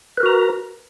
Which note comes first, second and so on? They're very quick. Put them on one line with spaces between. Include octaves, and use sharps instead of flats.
B4 A#4 F#4 A#5